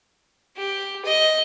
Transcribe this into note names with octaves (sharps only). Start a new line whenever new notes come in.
G4
D#5